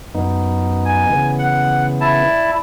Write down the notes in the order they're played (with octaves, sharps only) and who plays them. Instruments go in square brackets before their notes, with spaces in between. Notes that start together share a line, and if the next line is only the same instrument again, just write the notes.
[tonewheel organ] F#2 B3 D#4
[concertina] G#5
[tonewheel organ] C#3 E3 B3
[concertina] F#5
E4 A5
[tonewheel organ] D5